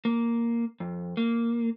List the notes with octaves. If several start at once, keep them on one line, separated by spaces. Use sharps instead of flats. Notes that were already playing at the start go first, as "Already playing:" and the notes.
A#3
F2
A#3